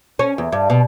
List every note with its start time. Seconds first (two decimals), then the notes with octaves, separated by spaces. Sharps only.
0.19 C#4
0.38 E2
0.52 G2
0.70 B2